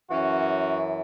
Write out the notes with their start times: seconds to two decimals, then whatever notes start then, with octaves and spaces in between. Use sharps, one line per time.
0.10 F#2 E3 C#4 F#4